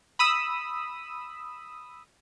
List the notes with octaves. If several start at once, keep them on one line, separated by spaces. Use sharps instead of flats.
B5 D#6 E6